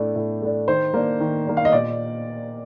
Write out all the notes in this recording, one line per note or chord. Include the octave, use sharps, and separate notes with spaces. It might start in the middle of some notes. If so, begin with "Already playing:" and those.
Already playing: A2 A3 D4
A2
A3 D4
D#3 C5
A#3 D4
D#3
A#3 D4
F5
D#5
A#2 D5